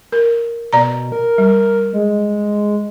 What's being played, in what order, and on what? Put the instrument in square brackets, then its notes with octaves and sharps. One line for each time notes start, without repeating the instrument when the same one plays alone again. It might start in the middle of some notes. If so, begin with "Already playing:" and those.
[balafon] A#4
[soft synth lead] B2 [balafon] D5 A#5
[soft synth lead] A#4
[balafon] G3
[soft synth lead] G#3